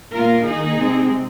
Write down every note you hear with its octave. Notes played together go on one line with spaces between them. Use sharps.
A#2 A#3 F4 A#4
D#3 A#3 D#4 G#4
C3 G#3 C4